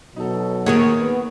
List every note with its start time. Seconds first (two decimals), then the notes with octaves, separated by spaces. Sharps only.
0.16 B2 F#3 D#4 A4
0.66 D#3 A#3 D#4 G#4 A#4 C#5
0.99 B3